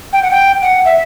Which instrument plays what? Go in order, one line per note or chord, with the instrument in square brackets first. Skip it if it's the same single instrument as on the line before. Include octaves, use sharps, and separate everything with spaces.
[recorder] G5
F#5
G5
F#5
E5